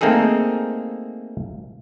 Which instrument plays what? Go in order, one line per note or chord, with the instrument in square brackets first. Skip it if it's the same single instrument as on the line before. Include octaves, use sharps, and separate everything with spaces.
[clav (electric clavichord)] A3 A#3 C4 D#4 G#4 A4